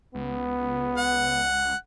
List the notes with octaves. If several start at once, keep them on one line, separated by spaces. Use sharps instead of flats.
C#2 B3
F#5